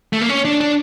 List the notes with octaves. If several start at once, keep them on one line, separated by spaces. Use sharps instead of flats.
A3
A#3
C#4
D4
D4